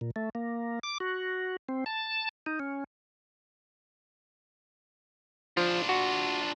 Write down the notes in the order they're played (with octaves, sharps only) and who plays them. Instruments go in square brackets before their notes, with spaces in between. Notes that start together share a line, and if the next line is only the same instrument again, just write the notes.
[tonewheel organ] A#2
A3
A#3
D6
F#4
C4
A5
D#4
C#4
[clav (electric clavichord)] F3 [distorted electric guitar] D4 F4
[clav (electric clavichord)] F#4